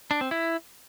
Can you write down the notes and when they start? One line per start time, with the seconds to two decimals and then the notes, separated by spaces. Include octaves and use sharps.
0.11 D4
0.21 C4
0.31 E4